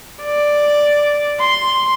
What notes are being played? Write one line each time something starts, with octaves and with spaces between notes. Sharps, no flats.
D5
C6